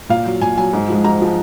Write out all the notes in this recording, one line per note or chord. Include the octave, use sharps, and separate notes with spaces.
A#2 F5
F#3
A#2 G#5
F#3 G#5
G#2
F3 G#3
G#2 A#5
F3 G#3